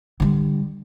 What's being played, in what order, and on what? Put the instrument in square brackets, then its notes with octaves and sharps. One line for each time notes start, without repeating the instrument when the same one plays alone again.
[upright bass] D3 G3